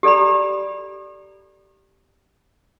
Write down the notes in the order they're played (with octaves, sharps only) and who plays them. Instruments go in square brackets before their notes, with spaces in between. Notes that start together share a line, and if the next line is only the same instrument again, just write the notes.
[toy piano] G4 A4 D5 A#5 B5